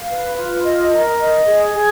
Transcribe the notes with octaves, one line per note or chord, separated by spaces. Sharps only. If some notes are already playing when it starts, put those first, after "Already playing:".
Already playing: F5
B4
F4
D#5
A#4
D#5
G#4
G#4